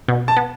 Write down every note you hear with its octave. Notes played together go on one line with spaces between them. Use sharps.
B2
A5
B3